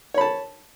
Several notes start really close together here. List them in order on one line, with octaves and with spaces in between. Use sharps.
C#5 B5 A5